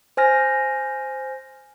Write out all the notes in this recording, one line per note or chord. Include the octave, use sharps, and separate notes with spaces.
C5 G#5 F6 A#6